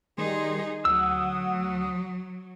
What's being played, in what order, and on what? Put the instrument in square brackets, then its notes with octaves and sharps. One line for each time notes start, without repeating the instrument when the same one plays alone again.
[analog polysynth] D#3 G3 C6 [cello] D#4 G#4
[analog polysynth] D2 F#5 D#6 [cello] F#3 [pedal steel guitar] E6